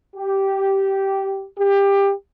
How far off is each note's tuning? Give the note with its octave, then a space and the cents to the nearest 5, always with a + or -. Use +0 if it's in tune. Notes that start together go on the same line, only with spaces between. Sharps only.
G4 -10
G4 +20